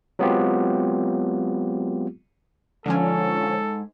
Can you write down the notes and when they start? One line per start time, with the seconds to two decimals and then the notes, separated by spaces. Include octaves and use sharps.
0.19 F#3 G#3 B3 C4 F4 G4
2.86 G#2 D3 F3 C#4 A4 G#5